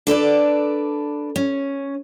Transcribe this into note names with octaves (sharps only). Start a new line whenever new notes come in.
D4 A4 B4 D5
C#4